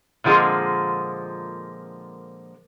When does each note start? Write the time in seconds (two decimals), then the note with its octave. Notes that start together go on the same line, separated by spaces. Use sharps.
0.24 A#2 D3 F3 G#3 A#3 C4